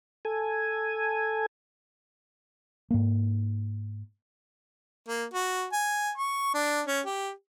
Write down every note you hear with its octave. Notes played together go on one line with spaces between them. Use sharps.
A4 G#5
G#2 A#3
A#3
F#4
G#5
C#6
D4
C#4
G4